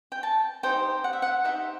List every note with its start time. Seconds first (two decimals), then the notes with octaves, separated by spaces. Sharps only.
0.12 G5
0.23 A5
0.63 D#4 G4 C5 G5
1.04 F#5
1.13 E5
1.22 F#5
1.44 D#4 G4 C5 E5